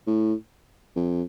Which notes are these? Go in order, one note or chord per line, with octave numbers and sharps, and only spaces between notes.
A2
F2